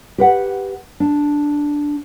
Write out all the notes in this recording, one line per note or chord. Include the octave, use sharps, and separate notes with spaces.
G4 B4 F#5
D4